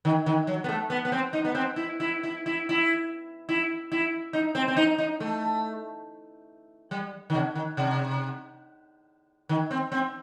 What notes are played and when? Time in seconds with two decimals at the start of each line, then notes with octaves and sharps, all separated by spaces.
0.05 D#3
0.26 D#3
0.47 F#3
0.64 B3
0.69 A3
0.90 B3
1.05 B3
1.12 C4
1.33 D#4
1.45 B3
1.55 C4
1.76 E4
2.00 E4
2.23 E4
2.46 E4
2.69 E4
3.49 E4
3.92 E4
4.33 D#4
4.55 C4
4.68 C4
4.77 D#4
4.98 D#4
5.20 A3
6.91 G3
7.30 D#3
7.34 C3
7.55 D#3
7.77 C3
9.49 D#3
9.71 C4
9.92 C4